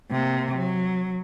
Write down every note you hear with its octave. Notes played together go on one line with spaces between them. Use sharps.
C3 A#3
F#3